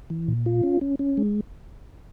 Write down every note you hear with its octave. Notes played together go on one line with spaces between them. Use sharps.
E3
A#2
F4
C#4
C#4
C#4
G#3